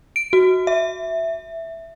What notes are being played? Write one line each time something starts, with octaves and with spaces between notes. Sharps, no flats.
D7
F#4
E5